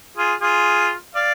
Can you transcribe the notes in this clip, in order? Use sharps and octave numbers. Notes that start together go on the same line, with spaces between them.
F4 G#4
F4 G#4
D5 F5